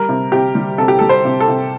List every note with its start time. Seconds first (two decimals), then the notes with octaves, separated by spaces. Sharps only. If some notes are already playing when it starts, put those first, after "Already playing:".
Already playing: G3 A#4
0.09 C3
0.32 C3 G4
0.55 G3
0.78 C3 A4
0.88 G4
0.99 G3 A4
1.09 C5
1.25 C3
1.40 A4
1.48 C3